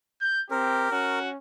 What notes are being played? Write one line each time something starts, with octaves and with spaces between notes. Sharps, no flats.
G6
C4 G4 A#4
C#4 F#4